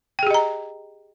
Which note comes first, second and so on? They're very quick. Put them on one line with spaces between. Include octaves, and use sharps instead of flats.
G5 G#4 G4 D#5 A#5